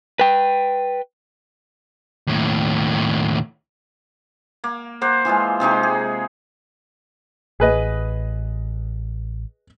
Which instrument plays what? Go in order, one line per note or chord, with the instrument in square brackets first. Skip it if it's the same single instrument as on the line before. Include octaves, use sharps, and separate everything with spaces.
[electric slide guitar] B4 G5
[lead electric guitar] D#2 A2
[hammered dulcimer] A#3
A#3 C5 F#5
E3 F3 G#3 F4
C3 G#3 D#4 G4
G#4
[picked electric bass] A1 [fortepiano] G#4 B4 D#5